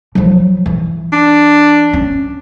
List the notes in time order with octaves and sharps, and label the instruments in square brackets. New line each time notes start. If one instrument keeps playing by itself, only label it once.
[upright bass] F3 F#3
E3
[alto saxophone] D4
[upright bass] C#4